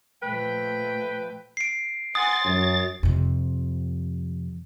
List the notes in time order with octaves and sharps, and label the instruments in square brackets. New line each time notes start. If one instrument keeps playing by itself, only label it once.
[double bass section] A#2 F3 A3 [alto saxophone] B4 [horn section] G5
[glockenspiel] C7 D7
[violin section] F#5 G#5 C6 [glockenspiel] D#6 [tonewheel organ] A6
[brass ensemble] F#2 [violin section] C#5
[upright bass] F2 C3